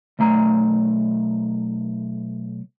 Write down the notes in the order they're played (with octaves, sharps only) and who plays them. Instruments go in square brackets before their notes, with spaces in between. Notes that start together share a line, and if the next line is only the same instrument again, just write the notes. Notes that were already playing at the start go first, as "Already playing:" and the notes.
[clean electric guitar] B1 A3 A#5